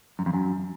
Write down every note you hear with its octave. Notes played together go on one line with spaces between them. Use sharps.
F#2
F2
F#2